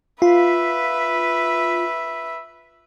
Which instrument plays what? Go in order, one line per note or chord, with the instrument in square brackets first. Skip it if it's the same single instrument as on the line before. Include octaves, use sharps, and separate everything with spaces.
[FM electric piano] F4 [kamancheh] B4 E5